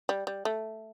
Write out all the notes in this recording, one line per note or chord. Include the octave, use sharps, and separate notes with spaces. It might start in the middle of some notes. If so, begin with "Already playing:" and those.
G3
G3
A3